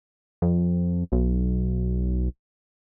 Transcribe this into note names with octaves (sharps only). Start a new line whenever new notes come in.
F2
B1